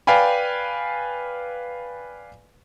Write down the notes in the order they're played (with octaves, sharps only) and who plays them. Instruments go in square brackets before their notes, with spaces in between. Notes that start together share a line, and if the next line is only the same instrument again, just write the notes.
[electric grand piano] B4 D5 F5 G5 G#5 B5